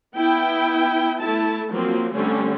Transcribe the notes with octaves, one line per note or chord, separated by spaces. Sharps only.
B3 E4 G5
A3 E4 A5
F3 F#3 A#3 C4
D3 G3 A3 C4 C#4